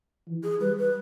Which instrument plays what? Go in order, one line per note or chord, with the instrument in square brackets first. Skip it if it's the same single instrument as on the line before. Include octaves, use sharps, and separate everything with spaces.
[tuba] E3
[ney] G#4
[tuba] G3 [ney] B4
[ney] B4